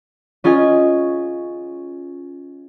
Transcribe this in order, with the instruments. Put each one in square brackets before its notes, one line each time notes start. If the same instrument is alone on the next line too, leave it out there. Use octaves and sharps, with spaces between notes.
[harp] C#4 F4 G#4 D#5 G#5